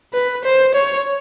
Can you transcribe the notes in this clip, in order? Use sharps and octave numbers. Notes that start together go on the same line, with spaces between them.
B4
C5
C#5